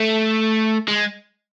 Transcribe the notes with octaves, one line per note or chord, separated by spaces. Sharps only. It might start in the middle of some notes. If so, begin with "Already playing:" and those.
Already playing: A3
G#3